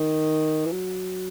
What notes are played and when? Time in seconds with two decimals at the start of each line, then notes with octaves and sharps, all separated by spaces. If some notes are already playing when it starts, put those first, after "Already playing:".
Already playing: D#3
0.65 E3
0.72 F#3